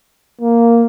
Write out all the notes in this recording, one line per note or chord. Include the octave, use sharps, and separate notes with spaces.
A#3